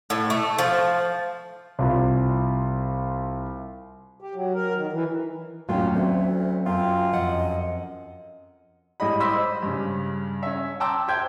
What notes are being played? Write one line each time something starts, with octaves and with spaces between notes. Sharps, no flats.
A2
A3
F3
C2 F4
G4
F#3
A#4
D#3
E3
G#1 D#2 A2 F#3 C#4 F4
D2 C4 E5
F#2 F4 G5
F2 D#5 F#5
A1 G3 G#3 E4 D#5 B5
C5 D#5 B5 D6 E6 B6
G2 C#3
C#4 E5
G5 A5 A#5 C6 D6 E6
C5 E5 G5 G6 G#6